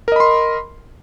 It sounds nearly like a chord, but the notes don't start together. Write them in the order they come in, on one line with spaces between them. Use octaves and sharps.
A#4 D#5 B5 C6